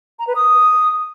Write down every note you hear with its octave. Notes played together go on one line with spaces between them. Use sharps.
A#5
B4
D#6